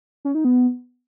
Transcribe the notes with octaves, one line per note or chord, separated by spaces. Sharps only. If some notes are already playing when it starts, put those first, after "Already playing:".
C#4
D#4
B3